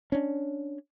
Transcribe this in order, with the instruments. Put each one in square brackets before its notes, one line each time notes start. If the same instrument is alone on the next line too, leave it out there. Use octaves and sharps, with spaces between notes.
[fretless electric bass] C#4 D4